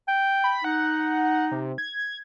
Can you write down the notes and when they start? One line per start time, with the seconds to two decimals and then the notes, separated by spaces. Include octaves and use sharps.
0.08 G5
0.44 B5
0.64 D#4 F#5
1.52 C3
1.78 G#6